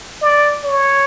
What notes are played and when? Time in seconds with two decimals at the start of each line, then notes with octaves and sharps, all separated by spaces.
0.22 D5
0.64 C#5